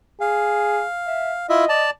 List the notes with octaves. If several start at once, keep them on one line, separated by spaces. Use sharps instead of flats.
G#4 F5
E5
E4 F4 D#5 E5
D5 A5